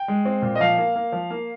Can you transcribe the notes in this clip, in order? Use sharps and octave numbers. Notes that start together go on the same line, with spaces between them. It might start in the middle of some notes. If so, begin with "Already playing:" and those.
Already playing: G5
G#3
C4
A#2
D#5
F3 F5
A#3
A#3
F3
A#3